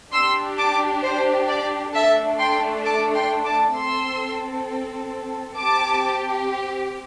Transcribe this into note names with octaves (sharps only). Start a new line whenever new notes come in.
D4 G4 C6 E6
A5 D6
C5
D5
A3 D4 A4 E5 A5
G5 C6
A5 D6
G5 C6
A5 D6
C4 A4 C6 E6
C4 G4 A5 D6